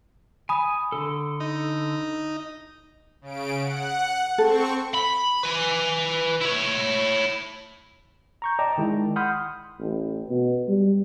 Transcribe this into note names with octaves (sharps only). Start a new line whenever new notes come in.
G#5 B5 D#6
D3 A4
D#4
C#3 D7
F#5
C4 A4 C#6
B5
B4 G#5
E4 C#5
A#5 C#6 G6
D5 D#5 G5 A5 A#5 D6
D#3 G#3 E4 G5
F#5 B5 C6 D#6 F6 G6
A1
B2
G3